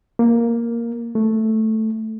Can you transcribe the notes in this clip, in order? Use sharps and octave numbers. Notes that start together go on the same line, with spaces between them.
A#3
A3